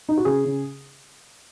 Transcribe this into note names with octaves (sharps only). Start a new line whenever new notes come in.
D#4
F#4
C#3 G#4
C#3